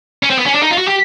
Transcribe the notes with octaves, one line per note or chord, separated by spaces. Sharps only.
C#4
C4
B3
C#4
D4
D#4
F4
F#4
G4